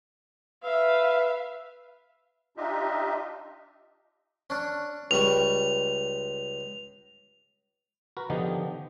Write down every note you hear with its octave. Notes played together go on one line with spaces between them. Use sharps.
B4 E5 F5
D4 D#4 F4 G4 D#5 E5
C#4 D4
C#2 G3 C#6 F7
F#4 A#4 B4
D3 D#3 F3 B3 D#4 G4